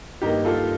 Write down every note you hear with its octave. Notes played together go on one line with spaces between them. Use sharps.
G2 D#3 A#3 D#4 G4
F4 A4